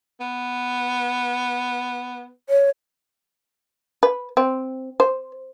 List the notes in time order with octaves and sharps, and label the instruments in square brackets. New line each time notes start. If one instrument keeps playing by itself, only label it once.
[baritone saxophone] B3
[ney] C#5
[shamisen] B4
C4
C5